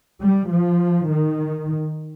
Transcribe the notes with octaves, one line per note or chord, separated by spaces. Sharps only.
G3
F3
D#3